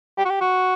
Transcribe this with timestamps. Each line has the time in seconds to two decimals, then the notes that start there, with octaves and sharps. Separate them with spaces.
0.18 G4
0.25 F#4
0.30 G4
0.41 F#4